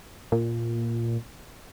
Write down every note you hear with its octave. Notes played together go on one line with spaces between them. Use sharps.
A#2